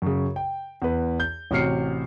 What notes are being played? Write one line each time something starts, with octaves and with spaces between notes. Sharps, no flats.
F#2 C#3
G5
E2 B4
G6
A1 C3 F#4 F6 C7 C#7